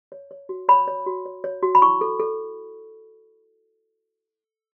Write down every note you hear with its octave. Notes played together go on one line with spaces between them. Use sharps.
C#5
C#5
F#4
C#5 B5
C#5
F#4
C#5
C#5
F#4
B5
E4 C#6
A4
A4